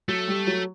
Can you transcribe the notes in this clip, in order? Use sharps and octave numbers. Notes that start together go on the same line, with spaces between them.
F#3 A3
G3
F#3